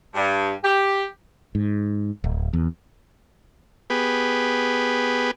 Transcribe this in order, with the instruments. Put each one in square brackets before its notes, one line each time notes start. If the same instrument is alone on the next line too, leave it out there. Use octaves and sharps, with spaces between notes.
[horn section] G2
G4
[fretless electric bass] G#2
D1
E2
[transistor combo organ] B3 G4 G#4 B4